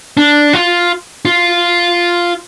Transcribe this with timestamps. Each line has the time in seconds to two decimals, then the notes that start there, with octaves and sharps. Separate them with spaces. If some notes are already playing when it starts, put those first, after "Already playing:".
0.17 D4
0.53 F4
1.25 F4